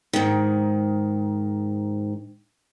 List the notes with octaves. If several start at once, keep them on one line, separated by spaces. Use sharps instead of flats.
G#2 D#3